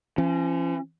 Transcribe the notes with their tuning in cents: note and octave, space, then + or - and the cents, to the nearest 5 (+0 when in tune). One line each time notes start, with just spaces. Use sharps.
F3 -45 C#4 -25